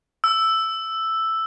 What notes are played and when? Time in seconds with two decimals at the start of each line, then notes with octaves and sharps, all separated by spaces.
0.24 E6